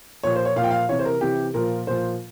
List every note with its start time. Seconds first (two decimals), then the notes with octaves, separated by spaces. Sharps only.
0.23 A#2 F3 C#5
0.36 C5
0.45 C#5
0.56 A#2 F5
0.61 F3 G5
0.70 F5
0.89 C3 E3 C#5
0.99 C5
1.05 A#4
1.21 C3 E3 G4
1.54 A#2 F3 A#4
1.87 A#2 F3 C5